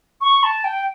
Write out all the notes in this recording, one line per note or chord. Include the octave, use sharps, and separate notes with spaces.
C#6
A5
G5